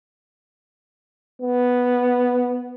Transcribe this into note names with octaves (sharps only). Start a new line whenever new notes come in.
B3